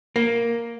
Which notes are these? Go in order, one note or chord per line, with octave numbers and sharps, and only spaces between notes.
A#3